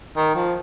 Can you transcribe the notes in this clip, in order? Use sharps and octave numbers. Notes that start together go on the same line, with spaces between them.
D#3
F3